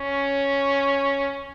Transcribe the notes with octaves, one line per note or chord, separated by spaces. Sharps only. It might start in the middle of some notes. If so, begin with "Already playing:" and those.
Already playing: C#4